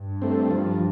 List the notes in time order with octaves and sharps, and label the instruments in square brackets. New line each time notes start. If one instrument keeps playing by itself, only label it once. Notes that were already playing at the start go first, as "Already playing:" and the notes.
Already playing: [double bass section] G2
[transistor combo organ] A3 C4
F3